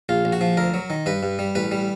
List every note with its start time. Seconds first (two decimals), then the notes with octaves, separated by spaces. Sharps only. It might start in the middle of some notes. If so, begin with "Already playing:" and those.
0.09 A#1 F4
0.25 A#1
0.33 F#4
0.41 F3
0.57 D2 A#4
0.74 F#3
0.90 D#3
1.06 G2 B4
1.23 G2
1.39 G3
1.55 A1 B4
1.72 G3